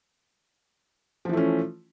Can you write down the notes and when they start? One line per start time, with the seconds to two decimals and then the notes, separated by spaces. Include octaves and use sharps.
1.25 F3
1.29 E3
1.33 A3
1.37 C#4